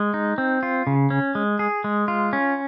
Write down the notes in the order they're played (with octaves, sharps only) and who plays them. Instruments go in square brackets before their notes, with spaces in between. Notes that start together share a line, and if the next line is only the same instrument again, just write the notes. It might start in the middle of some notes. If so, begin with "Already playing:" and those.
Already playing: [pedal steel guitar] G#3
D#4
C4
F4
C#3
C#4
G#3
G#4
G#3
F4
C#4